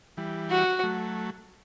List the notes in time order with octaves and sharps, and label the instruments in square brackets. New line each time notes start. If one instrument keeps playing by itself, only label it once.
[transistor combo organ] E3 G3
[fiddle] F#4
[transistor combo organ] F#3 A3